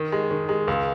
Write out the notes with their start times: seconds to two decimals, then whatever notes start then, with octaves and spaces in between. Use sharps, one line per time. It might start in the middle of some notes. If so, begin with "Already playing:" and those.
Already playing: D#3
0.12 G#3
0.31 D#3
0.49 G#3
0.68 C#2